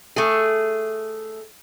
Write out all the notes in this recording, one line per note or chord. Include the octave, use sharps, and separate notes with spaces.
A3 G#4